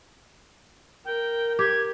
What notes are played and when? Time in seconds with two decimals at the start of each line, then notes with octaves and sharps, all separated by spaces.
1.05 A#4 G5
1.59 G4 G#6